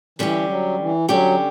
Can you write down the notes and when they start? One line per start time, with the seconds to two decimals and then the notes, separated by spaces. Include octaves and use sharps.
0.19 D3 E3 G3 C#4 G4
0.49 F#3
0.79 E3
1.09 D3 F#3 G3 C#4 G4